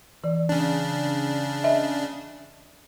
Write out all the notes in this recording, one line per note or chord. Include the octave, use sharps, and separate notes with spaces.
E3 D5
C#3 D4
D#5 E5